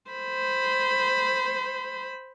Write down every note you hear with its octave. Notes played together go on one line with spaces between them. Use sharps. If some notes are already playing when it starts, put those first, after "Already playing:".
C5 B5